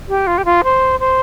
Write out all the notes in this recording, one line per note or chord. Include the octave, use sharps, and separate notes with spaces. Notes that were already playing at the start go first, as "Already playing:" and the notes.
G4
F4
G4
F4
C5
C5